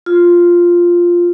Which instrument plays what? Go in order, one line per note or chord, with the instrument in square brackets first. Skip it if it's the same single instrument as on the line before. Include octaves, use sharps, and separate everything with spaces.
[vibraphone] F4